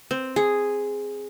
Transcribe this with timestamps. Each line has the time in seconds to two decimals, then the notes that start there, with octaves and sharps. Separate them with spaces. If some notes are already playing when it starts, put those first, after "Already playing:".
0.11 C4
0.36 G#4